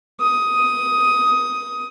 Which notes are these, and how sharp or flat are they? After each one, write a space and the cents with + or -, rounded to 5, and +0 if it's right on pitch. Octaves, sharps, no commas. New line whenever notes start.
D#6 +10